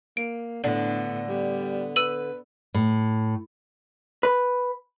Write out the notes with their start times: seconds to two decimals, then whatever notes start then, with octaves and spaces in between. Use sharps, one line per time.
0.17 A#3 D7
0.64 A2 D3 B3 D4
1.28 G3 B3
1.96 B4 E6 D#7 F#7
2.74 A2
4.23 B4